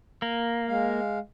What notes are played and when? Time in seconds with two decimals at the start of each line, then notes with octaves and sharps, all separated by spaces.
0.22 A#3
0.68 G#3 F5